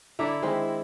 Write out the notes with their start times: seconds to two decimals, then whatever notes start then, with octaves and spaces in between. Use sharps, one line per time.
0.19 D3 E4 A4 D5 E5 A#5 D6
0.42 D#3 G#3 C4